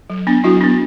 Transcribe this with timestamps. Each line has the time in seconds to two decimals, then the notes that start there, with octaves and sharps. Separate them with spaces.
0.10 F#3
0.27 B3 D4
0.44 F#3 E4 F#4
0.61 B3 D4